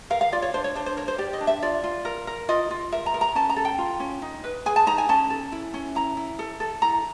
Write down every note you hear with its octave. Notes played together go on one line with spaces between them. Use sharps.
A#4 F5
F5
F4 D5
C#5
D4 C5
C#5
D4 C5
C5
A#4 C#5
C5
G4 D5
D#5
D4
E5
F4 D5
F4
A#4
A#4
F4 D#5
F4
A#4 E5
A#5
A#4
A#5
C#4 A5
A#5
A4
G5
F4
C#4
D#4
B4
G#4 G#5
A5
D#4 A#5
G#5
C#4 A5
A4
E4
C#4
E4 A#5
E4
A4
A4
E4 A#5